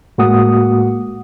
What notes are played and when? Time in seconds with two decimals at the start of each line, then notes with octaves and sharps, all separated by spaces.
0.18 A2 G#3 A#3 F#4 F#5 D#6